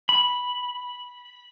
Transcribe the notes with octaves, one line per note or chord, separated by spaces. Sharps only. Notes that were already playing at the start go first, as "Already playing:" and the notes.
B5